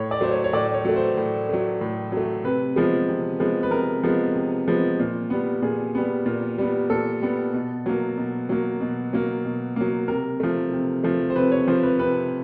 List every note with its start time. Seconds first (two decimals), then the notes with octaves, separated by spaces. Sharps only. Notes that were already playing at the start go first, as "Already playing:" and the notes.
Already playing: A2 C#5
0.11 D5
0.21 F#3 A3 C5
0.31 C#5
0.44 C#5
0.53 A2 D5
0.74 C#5
0.85 F#3 A3
0.96 C5
1.17 A2
1.49 F#3 A3
1.81 A2
2.12 F#3 A3
2.44 C3 B4
2.76 F3 G#3 B3
3.08 C3
3.40 F3 G#3 B3
3.63 B4
3.71 C3 A#4
4.03 F3 G#3 B3
4.35 C3
4.68 F3 G#3 B3
4.99 A#2
5.30 G3 B3
5.62 A#2 G#4
5.95 G3 B3
6.26 A#2
6.58 G3 B3
6.90 A#2 A4
7.22 G3 B3
7.54 B2
7.86 F#3 A#3
8.18 B2
8.49 F#3 A#3
8.81 B2
9.13 F#3 A#3
9.45 B2
9.76 F#3 A#3
10.08 C3 A#4
10.40 F3 A3
10.72 C3
11.03 F3 A3
11.30 C5
11.36 C3 B4
11.52 C#5
11.68 F3 A3 C5
11.83 B4
11.99 C3 B4